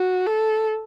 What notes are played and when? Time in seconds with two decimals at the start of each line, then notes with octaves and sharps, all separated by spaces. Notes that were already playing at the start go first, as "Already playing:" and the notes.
Already playing: F#4
0.26 A4